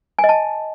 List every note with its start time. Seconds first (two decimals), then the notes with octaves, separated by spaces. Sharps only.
0.19 G#5
0.24 D#5
0.29 A5